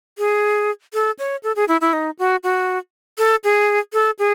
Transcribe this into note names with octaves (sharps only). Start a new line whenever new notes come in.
G#4
A4
C#5
A4
G#4
E4
E4
D#4
F#4
F#4
A4
G#4
A4
G#4